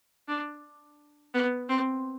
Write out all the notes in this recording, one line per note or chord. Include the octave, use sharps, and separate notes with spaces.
D4
B3
C4